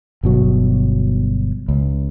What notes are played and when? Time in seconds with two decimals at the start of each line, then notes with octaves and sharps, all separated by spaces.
0.23 G1 B2 F#3
1.68 C#2